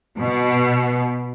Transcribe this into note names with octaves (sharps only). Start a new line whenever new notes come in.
B2